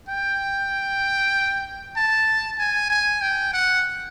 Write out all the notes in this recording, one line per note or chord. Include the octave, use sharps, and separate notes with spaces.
G5
A5
G#5
G#5
G5
F#5